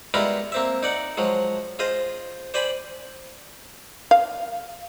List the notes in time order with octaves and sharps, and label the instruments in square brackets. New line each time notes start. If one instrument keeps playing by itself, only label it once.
[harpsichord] G3 G#3 B3 E4 F4 A#4
A#3 C4 E5
D#4 D5 F#5
F3 F#3 G#3
F4 G#4 C5 D#5
C5 D5 G5 G#5 B5
[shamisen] F5